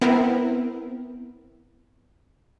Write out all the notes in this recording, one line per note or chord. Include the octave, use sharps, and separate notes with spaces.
B3 C4 E4 A#4